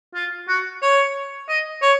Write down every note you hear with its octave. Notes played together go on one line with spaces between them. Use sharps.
F4
F#4
C#5
D#5
C#5